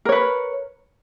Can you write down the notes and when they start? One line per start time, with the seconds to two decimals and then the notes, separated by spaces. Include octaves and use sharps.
0.05 A#4
0.09 C#5
0.12 B4